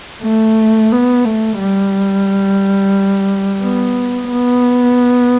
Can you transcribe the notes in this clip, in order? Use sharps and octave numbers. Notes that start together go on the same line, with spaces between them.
A3
B3
A3
G3
B3
B3